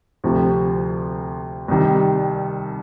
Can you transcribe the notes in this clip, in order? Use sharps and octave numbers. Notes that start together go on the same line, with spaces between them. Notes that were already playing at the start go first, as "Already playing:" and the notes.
D2 C3 F3
C2 C3 D#3 G3